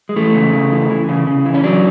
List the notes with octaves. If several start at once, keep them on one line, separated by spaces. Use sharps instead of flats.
G#3
E3 A3
C#3
C#3
E3
E3
C#3
C#3
E3
C#4
F#3 D4